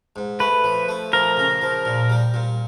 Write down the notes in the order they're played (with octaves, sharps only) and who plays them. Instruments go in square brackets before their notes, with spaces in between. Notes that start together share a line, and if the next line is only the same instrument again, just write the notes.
[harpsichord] G#2
[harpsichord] A3 [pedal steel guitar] B4
[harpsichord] F3
A3
[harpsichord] F3 [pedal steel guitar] A#4
[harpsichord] C#3
F3
A#2
G3
A#2